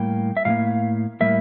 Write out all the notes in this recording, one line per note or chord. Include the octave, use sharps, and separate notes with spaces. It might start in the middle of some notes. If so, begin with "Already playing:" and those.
Already playing: A2 G3 A#3 G5
E5
A2 G3 A#3 F5
A2 G3 A#3 E5